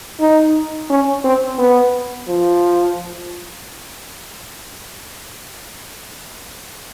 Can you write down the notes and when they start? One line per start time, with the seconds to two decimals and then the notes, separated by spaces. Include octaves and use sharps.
0.20 D#4
0.90 C#4
1.24 C4
1.58 B3
2.28 F3